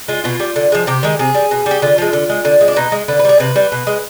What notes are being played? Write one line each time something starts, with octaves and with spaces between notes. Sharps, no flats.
G#3 F4
B2 F4
G3
D3
F3 G#3
C3 G4
D#3 G#3
C3 G#4
G3
B2
G3
G4
D3 F4
F3 G#3
D3
G#3
D3
G#3
D4
B2 D#4
G#3
D3 B4
B4
G3 G#4
C3 B4
G3
B2
G#3